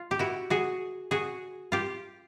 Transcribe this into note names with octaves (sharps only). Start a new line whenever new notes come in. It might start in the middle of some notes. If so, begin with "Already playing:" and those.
Already playing: F4
G4
E4 F#4
F#4 G#4
F#4 G#4
F4 G4